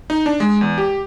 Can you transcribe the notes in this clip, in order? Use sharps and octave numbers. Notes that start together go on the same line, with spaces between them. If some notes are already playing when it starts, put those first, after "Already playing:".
D#4
D4
G#3
E2
G4